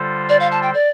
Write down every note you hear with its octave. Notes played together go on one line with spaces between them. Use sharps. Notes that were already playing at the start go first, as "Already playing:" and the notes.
Already playing: D3 G3 F4 A4 C5
D5
F5
A5
G5
D5